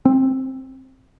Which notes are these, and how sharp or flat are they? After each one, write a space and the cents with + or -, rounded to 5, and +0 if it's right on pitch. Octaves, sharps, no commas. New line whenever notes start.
C4 +10